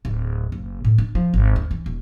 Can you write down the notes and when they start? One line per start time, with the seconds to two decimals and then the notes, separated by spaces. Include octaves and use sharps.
0.05 D1
0.52 F#1
0.85 A2
0.98 D4
1.15 F3
1.34 G#1
1.56 D2
1.71 E3
1.86 D#1